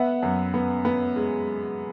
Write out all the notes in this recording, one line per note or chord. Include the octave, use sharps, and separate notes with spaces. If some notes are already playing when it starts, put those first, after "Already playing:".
Already playing: B3 E5 F#5
F#2
B3
B3
G#3